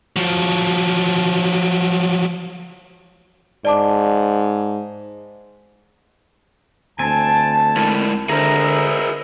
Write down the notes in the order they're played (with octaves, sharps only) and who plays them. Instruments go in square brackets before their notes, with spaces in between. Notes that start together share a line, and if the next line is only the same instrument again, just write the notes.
[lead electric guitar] F3 F#3
[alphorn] G#2 [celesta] D5 A5 D6
[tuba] D2 [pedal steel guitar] C4 G#5 [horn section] A5
[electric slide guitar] G#3 E4 A#4
[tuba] D3 [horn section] G#3 B3 E5 [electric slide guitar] G#4 A#4 C5 [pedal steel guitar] A#5